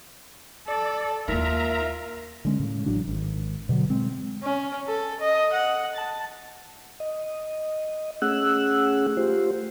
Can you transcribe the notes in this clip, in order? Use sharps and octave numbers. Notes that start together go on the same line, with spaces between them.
A4 D5
D#2 D#4 F4 A#4 E5 A#5
D3 G#3 C#4
A2 C#3
A1 A2 F#3 D4
G#1
B2 D3 E3 F#3
G#3 C4
C#4
A4
D#5
F#5
A5
D#5
A3 C#4 G#4 F#5 E6 F#6
A3 F4 G4 C5